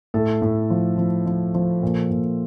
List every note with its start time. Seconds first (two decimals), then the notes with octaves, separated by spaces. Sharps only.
0.14 A2 A4
0.42 A2
0.70 F3
0.98 F3
1.26 F3
1.55 F3
1.83 A#2
2.11 A#2